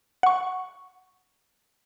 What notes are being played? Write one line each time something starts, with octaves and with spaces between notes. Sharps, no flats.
F#5 C#6